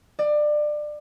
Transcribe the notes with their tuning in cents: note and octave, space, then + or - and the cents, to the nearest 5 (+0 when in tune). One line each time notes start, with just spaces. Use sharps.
D5 +25